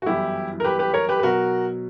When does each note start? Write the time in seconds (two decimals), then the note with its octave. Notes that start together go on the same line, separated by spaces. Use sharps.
0.02 F#4
0.06 G1 F#2 E3 E4 G4
0.60 A#4
0.64 G4 B4
0.79 G4 B4
0.94 A#4 C#5
1.09 G4 B4
1.19 B4
1.23 B2 F#3 F#4 A#4